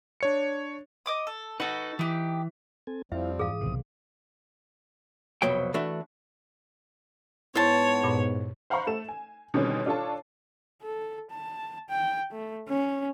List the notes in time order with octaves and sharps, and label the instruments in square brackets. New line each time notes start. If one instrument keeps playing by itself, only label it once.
[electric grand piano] D4 C#5 C#7
[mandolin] D#5 D6 D#6
A4
[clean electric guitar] D#4 B4 [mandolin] F#4 A4
[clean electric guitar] E3 [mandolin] D#4 G4
[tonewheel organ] C4 A4 G#5
[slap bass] F2 [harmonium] F3 G3 C4 [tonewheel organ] E4 F5 [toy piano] E5
[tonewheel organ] G#2 E3 D#6 [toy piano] G#4 F5
[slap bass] B1 C3 D#3 [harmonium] C4
[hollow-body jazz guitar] C2 F2 B2 F#3 G5
E3 A3 D4 F#4
[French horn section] G#2 B3 [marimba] E4 [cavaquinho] C5 A5 [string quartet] C#5
[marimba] G2 A#2
[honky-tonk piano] C5 F5 F#5 A#5 B5 C#6
A3 A4 E7
G#5
B2 D3 D#3 G3 C4 C#4
D4 F4 A4 C#5 A5
[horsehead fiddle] A4
A5
G5
A3
C#4